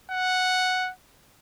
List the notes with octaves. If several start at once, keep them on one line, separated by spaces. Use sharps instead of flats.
F#5